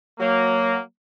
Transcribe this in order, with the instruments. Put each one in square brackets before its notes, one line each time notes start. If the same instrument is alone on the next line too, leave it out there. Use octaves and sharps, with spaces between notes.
[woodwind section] F#3 A#3